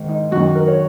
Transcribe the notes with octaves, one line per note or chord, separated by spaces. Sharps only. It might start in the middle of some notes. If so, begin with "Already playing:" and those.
Already playing: G#2 D#3
D#4
F#2 D#3 F#4
A#4
C#5